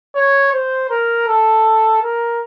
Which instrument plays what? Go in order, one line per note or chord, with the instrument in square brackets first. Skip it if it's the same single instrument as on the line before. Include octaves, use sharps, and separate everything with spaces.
[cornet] C#5
C5
A#4
A4
A#4